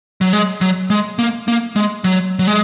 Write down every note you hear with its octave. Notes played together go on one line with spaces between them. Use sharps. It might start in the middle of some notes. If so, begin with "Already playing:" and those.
F#3
G#3
F#3
G#3
A#3
A#3
G#3
F#3
F#3
G#3